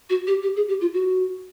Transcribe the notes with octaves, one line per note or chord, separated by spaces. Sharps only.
F#4
G4
G4
G#4
G4
F4
F#4